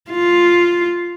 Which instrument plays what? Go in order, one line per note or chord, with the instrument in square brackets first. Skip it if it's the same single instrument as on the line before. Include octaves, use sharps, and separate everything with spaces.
[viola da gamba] F4